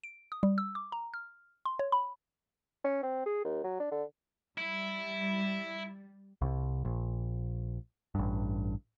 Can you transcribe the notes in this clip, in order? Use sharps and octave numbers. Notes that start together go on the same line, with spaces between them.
D7
D#6
G3
E6
D6
A#5
F6
C6
C#5
B5
C#4
C4
G#4
D#2
F#3
D4
D3
G3 E4
C2
A#1
A1 G2